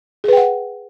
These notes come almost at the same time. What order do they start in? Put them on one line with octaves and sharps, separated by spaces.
G#4 B4 G5 F#5